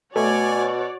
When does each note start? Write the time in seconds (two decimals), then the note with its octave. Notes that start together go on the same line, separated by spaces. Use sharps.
0.16 B2 A3 F#4 C#5 D5 G#5